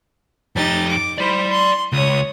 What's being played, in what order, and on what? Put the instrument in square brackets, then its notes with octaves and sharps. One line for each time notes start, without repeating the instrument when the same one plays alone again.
[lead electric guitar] F2 G4 [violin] D#4 A6
[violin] D6
[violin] E4 C5 [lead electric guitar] D5 B5
[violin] C6
[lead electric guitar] C#2 [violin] C#5 D#6